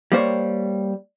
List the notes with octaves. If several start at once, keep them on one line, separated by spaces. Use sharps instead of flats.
G3 A#3 C5 C#5